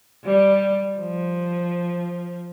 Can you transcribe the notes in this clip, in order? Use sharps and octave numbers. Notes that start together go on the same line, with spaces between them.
G3
F3